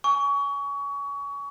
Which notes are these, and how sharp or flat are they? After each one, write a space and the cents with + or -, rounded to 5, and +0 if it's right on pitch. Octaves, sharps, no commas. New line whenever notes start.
G#5 +0 C#6 +30